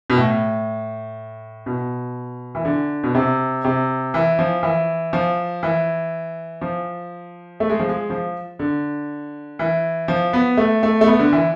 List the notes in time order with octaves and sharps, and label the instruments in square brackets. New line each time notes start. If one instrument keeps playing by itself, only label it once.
[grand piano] B2
A2
B2
E3
D3
B2
C3
C3
E3
F3
E3
F3
E3
F3
A3
G#3
F3
G#3
F3
D3
E3
F3
B3
A3
A3
A3
B3
D3
E3